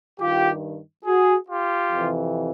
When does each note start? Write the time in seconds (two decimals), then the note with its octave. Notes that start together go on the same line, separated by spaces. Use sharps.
0.19 G2 D#3 F4 G4
1.05 F#4 G#4
1.48 F4 G4
1.91 F2 C3 E3